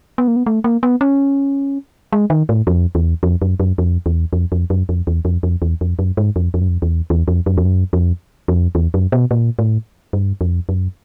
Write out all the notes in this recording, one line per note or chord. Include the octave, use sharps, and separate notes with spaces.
B3
A#3
B3
A3
A#3
B3
C#4
G#3
D#3
A2
F2
E2
F2
F#2
F#2
F2
E2
F2
F2
F#2
F2
E2
F2
F2
E2
F2
F#2
G#2
F2
F2
F#2
F2
E2
E2
F2
F#2
F2
F#2
F2
F2
E2
F#2
B2
A#2
A2
G2
F2
F#2